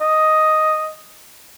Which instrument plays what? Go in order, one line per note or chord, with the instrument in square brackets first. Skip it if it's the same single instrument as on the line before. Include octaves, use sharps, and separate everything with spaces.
[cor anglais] D#5